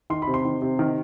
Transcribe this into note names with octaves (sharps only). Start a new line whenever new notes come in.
D#3 C6
B5
C3
C6
D#3
C3
D#3